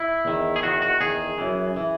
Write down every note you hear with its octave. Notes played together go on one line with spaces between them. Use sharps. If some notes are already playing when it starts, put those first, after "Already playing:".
Already playing: E4
E2 D#3
G#4
E2 D#3 F#4
F#4
E2 D#3 G#4
F#2 E3
E3